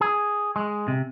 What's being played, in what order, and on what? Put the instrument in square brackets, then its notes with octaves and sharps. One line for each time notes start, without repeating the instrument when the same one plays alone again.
[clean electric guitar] G#4
G#3
C3